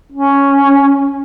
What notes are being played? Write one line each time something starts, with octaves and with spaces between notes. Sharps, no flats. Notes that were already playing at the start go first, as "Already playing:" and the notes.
C#4